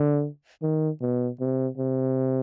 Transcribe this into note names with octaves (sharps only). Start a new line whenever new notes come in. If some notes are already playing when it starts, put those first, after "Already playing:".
Already playing: D3
D#3
B2
C3
C3